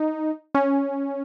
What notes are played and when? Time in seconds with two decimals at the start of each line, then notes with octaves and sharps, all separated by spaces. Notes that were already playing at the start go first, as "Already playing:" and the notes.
Already playing: D#4
0.55 C#4